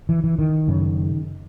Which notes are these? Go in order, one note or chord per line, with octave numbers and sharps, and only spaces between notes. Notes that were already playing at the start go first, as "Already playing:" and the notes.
E3
E3
D#3
F#2 C#3